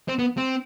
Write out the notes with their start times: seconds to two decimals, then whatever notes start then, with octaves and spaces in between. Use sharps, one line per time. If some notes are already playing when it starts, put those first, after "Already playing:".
0.09 C4
0.19 B3
0.37 C4